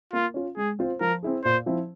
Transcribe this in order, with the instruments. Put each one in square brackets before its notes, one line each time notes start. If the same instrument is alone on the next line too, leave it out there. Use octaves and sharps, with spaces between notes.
[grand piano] A#3 [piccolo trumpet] F4
[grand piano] C#4 F4
[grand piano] G#3 [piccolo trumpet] G#4
[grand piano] C4 F4 C5
[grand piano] F3 [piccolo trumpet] A#4
[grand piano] C4 E4 G#4
[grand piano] A#2 [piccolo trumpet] C5
[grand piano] F3 C4 E4